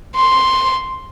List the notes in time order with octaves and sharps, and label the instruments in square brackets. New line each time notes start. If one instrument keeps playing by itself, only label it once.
[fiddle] C6